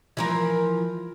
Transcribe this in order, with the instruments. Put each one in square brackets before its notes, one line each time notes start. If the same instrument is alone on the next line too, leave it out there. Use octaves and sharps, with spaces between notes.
[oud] E3 F3 A#4